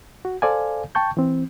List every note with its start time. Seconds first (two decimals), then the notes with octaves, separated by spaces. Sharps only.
0.25 F#4
0.42 A4 C5 D5 F5 G#5
0.95 G5 A5 C#6 G6
1.17 E3 C4